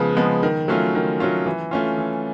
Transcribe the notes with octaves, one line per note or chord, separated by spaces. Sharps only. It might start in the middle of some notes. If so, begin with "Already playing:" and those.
Already playing: C#3 F3 G#3 B3
F3 G#3 B3
D#3
F#3 A3 C#4 F4
D#3
F#3 A3 C#4 F4
E3
A3 C#4 F4
E3